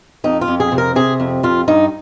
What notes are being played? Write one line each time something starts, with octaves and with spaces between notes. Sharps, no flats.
F2 D#4
F4
F2
G#4
C3
A#4
C3 G#4
F2
F2 F4
G2 D#4